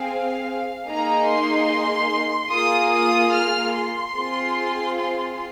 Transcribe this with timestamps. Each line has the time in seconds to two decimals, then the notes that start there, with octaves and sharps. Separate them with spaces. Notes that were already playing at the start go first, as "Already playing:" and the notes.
Already playing: C4 G#4 F5
0.88 A#3 D#4 G#4 A#5
1.28 C6
2.52 A#3 F4 G#4 D#6
2.93 D#6
3.34 F6
3.75 C6
4.15 C4 F4 G#4
4.98 C6